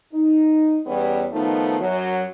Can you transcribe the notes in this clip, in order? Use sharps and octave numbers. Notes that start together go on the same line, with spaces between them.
D#4
E2 G3 B3 C#4 C#5
D#3 F3 A3 B3 D#4
F#2 F#3